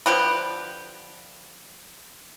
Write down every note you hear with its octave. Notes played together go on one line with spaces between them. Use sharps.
D3 F3 G4 B4